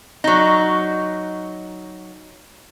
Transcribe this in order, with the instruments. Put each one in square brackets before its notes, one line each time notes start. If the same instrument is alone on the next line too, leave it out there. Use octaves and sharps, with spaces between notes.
[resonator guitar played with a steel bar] F#3 D#4